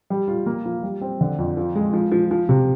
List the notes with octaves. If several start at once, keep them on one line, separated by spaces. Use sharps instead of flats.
G3
F4
A#3
F3
G3
C4
D3
F2
F3
G#3
F3
F3
F3
C3